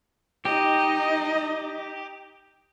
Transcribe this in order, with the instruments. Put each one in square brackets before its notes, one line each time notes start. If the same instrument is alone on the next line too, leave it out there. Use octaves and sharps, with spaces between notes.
[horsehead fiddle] D#4 D#5 [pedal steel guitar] G4